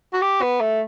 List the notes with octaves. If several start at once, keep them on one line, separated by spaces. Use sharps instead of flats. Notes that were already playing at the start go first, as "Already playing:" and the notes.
F#4
G4
B3
A3